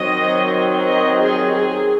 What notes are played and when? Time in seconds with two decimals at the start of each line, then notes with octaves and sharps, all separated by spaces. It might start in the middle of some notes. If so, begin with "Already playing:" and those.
Already playing: D#3 F#3 C4 D#5
0.86 D#5
1.19 G#4
1.52 G#4